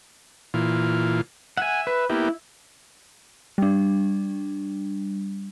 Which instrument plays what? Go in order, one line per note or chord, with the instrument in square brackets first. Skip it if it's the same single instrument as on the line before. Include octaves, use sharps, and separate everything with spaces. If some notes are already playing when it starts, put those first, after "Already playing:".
[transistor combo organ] A#2 E3 F4
[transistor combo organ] E5 [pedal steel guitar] F#5 G#5
[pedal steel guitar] B4
[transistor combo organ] A#3 B3 G4 [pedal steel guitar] E4
[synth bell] G3 D4